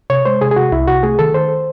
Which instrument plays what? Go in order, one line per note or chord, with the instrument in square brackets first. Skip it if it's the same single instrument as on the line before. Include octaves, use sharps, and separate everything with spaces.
[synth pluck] C3 [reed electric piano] C#5
[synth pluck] G#3 [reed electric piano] C5
[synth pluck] C3 [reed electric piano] G#4
[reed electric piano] G#4
[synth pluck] C3 [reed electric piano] F#4
[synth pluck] C2 [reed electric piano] E4
[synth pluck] C3 [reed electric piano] F#4
[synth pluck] A3 [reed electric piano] G#4
[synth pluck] D#3 [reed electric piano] A4
[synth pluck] D#3 [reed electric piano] C5